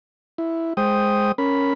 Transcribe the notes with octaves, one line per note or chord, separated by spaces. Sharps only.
E4
G#3 C5 G5 D#6
C#4 A#4 B5